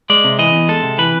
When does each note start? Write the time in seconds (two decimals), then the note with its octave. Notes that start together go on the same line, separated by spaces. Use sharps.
0.10 G#3 D5
0.24 C3
0.39 E3 D#5
0.53 E2
0.69 G#3 A4
0.83 C3
0.98 E3 B4